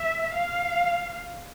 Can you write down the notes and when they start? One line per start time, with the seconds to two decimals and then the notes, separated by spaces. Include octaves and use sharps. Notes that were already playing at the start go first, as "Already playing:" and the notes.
Already playing: E5
0.34 F5